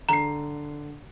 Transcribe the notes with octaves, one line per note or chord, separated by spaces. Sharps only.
D3 A#5 C7